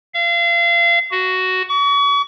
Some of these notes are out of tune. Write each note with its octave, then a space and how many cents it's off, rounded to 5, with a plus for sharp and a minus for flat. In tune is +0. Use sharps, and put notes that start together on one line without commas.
F5 -35
F#4 +10
C#6 +40